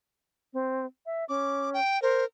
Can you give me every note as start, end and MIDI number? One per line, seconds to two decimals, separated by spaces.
0.53 0.86 60
1.06 1.25 76
1.29 1.80 61
1.29 1.70 86
1.74 2.01 79
2.02 2.25 70
2.02 2.24 72